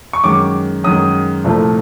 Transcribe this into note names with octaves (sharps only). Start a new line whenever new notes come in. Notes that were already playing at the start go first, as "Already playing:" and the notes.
C#6
F#2 D#3 G#3 D6
F#2 D#3 G#3 D#6
C2 A#2 F3 A3